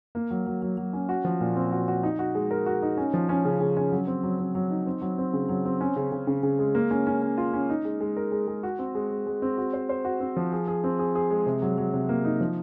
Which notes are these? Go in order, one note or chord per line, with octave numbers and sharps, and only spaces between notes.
A#3
F#3
F#3
F#3
F#3
C#4
F#4
F3
A#2
C4
F#4
F#4
D#4
F#4
G#3
A#4
F#4
D#4
C#4
F3
C#4
C#3
C#3
C#4
F#3
C4
F#3
C4
F#3
D#4
C4
F#3
C4
C#3
F#3
C4
C#4
C#3
C#3
C#3
C#3
G#3
A#3
C#4
C#4
C#4
F4
C#4
D#4
G#3
G#3
A#4
G#3
G#3
F#4
C4
G#3
G#3
G#3
C4
F#4
C5
C5
F#4
C4
F3
G#4
G#4
C4
G#4
G#4
G#3
C3
F#3
F#3
C3
A#3
D#4
F3